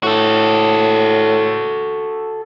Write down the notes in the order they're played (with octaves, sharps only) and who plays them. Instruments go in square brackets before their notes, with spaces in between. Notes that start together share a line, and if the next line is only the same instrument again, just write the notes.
[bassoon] A2 [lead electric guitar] F#4 A4